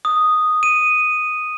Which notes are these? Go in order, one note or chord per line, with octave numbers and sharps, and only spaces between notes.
D#6
D#7